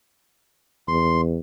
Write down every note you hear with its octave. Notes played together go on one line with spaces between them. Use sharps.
E2 C6